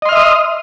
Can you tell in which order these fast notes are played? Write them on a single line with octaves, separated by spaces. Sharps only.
D#5 C6 F6 E5 D#6